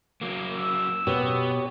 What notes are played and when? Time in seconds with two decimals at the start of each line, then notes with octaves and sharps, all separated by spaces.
0.21 F#3 A#3
0.55 E6
1.07 B2 B3 G4 C#5